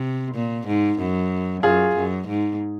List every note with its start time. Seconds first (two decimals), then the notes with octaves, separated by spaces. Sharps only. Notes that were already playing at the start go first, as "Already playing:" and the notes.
Already playing: C3
0.35 A#2
0.67 G#2
0.99 F#2
1.63 F#2 F4 G#4
1.96 F#2
2.28 G#2